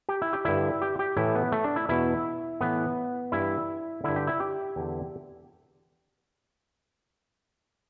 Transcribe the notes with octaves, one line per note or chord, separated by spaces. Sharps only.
G4
E4
G4
G2 D3 E4
G4
G4
A2 E3 E4
B3
A3
D4
E4
E2 B2 E4
A2 E3 B3
G2 E3 E4
G2 D3 E4
G4
E4
G4
E2 D3